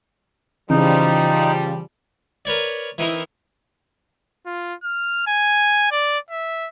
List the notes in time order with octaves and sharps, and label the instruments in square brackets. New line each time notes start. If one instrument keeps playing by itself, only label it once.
[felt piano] C#3 [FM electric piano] E3 [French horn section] F3 G3 [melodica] D#4
[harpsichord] A#4 B4 C#5 D5
E3 C4 D#4 E4 A#4
[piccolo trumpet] F4
F6
G#5
D5
E5